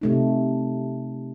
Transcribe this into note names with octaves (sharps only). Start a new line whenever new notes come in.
C3 A3 D#4